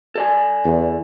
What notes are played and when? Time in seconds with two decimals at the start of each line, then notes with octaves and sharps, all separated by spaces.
0.15 A4 D5 G#5
0.64 E2